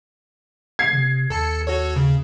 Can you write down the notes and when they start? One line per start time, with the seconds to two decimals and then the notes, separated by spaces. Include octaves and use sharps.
0.79 G#6 C7
0.93 C3
1.30 D#2 A4 A5 C#7
1.67 F#4 A4 C#5
1.96 C#3